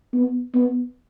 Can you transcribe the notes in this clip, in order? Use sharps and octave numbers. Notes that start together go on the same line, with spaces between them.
B3
B3